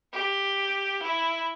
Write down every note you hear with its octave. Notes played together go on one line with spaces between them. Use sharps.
G4
E4